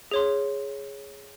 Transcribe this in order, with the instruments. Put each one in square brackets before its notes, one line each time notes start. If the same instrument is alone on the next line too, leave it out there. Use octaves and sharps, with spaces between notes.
[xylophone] G#4 C#5 C6